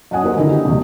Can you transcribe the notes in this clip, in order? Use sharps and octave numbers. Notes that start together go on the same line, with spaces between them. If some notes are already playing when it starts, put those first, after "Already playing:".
F#2 D#5 F#5 G#5 D#6
A#3 D#4 G4 A#4 C5 D#5
A#2 D3 D#3 D#4 E4 A4
D#3 G4
F1 C#2 B2